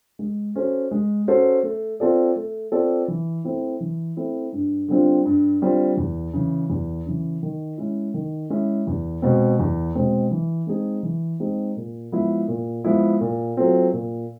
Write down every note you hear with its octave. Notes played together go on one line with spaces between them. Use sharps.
G#3
C#4 F#4 A4 C5
G#3
C#4 F#4 A4 C5
A3
C4 F4 A4 D5
A3
C4 F4 A4 D5
E3
A3 C4 E4
E3
A3 C4 E4
G2
D3 G3 C4 F4
G2
D3 G3 C4 F4
E2
C#3 E3
E2
C#3 E3
D#3
G#3 C#4 E4
D#3
G#3 C#4 E4
E2
B2 G#3 C4
E2
B2 G#3 C4
E3
G#3 C4 D#4 G#4
E3
G#3 C4 D#4 G#4
A#2
F3 G#3 B3 E4
A#2
F3 G#3 B3 E4
A#2
F#3 A3 C4 F4
A#2